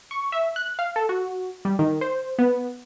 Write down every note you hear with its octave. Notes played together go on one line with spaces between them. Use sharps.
C#6
E5
F#6
F5
A4
F#4
G3
D#3
C5
B3